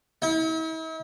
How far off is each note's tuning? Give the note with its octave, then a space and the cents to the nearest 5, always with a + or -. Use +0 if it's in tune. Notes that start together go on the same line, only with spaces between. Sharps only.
E4 -45